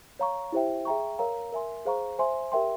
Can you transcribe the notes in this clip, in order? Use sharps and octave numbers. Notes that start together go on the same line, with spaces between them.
C#5 F5 A#5 C#6
E4 G4 C5 E5 G5
G#4 E5 G5 A#5 C#6
A#4 C#5 F5 A#5
A#4 E5 G#5 C6
G#4 C5 F5 A#5 C#6
C5 E5 G#5 C6
G4 A#4 E5 G5 C6